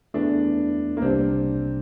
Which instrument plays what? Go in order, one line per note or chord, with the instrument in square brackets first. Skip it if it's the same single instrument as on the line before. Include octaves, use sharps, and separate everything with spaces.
[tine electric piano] E2 E3 A3 [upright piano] D4
[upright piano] A#3
[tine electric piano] C2 C3 G3 D4 [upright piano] C4